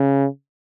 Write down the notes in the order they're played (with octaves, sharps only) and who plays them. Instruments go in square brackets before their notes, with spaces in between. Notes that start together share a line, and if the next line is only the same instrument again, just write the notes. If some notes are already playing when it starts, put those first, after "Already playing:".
Already playing: [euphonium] C#3